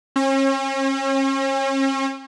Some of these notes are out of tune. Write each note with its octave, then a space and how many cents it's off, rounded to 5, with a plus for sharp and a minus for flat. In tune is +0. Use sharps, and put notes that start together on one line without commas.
C#4 -40